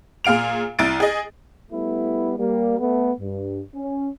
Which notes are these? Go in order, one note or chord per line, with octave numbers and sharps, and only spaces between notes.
A#2 G#4 F5 D7 F7
C2 E4 A6 D7
G#4 D#5
G3 A3 B3 E4
G3 A#3
A3 B3
G2
C#4